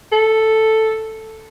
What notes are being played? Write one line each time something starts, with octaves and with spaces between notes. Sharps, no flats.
A4